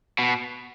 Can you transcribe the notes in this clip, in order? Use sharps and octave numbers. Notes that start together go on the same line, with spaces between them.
B2